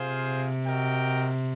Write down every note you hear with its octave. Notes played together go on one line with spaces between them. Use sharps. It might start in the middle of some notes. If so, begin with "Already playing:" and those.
Already playing: C3 F4 G#4 C5 F5
F#4 A#4 D#5 G5